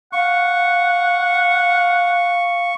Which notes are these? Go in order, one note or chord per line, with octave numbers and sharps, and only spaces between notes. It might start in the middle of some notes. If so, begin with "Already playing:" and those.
F5 F#5 C#6